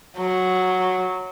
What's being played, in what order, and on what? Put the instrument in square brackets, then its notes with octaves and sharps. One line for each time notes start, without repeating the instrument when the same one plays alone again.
[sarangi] F#3